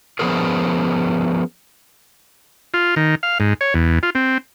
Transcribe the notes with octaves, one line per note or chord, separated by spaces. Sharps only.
F3 B3 C#4 D4 G#4 A#4
F4
D#3
F5
G#2
C#5
E2
F4
C4